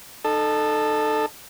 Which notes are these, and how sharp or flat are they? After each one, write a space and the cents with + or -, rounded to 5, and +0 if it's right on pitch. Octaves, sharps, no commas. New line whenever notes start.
D#4 -35 A4 +0